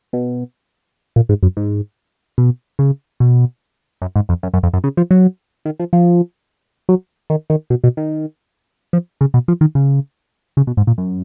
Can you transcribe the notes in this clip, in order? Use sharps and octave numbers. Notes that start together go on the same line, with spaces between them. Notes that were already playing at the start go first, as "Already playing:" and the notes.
B2
A#2
G#2
F#2
G#2
B2
C#3
B2
F#2
G#2
F2
F#2
F#2
F2
F#2
C#3
F3
F#3
D#3
F3
F3
F#3
D#3
D#3
B2
B2
D#3
F3
C#3
B2
F3
D#3
C#3
C#3
B2
G#2
A#2
F#2